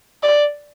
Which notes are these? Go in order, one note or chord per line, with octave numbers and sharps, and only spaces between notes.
D5